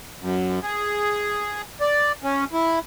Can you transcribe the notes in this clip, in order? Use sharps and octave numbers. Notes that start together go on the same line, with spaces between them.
F#2
G#4
D5
C#4
E4